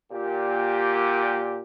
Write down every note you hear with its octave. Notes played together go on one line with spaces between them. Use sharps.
A#2 G4